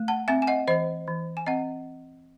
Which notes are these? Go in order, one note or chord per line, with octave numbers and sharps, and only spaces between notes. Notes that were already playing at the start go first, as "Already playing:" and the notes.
Already playing: A3
F#5 A5
C4 E5 G#5
G#5
D#5 F#5
E3 C5 D#5
E3
G#5
C4 D#5 F#5